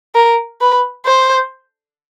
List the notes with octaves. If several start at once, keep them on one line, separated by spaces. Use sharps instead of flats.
A#4
B4
C5